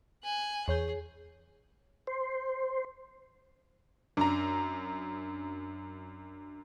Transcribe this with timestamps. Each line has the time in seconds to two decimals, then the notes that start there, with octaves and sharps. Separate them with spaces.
0.23 G#5 F#6
0.68 E2 G#4 C#5 G6
2.07 C5
4.17 F#2 D4 A#5